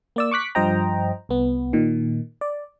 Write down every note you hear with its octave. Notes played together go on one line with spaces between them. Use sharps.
A#3 D5 E6
C#6 D6 F#6 B6
G2 F3 C5 D#5 G5 A#5
C2 B3
A#2 D#3
D5